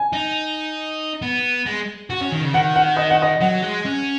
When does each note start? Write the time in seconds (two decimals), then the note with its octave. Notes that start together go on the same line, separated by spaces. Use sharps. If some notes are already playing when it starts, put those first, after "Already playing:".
Already playing: G#5
0.13 D#4
1.22 B3
1.66 G#3
2.10 F#4
2.21 C#4
2.32 D#3
2.42 C#3
2.54 D#3 F#5
2.76 F#5
2.97 D#5
3.10 F#5
3.22 D#5
3.41 F#3 F#5
3.62 G#3
3.85 C#4